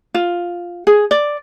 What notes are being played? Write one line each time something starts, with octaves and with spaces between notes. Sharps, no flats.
F4
G#4
D5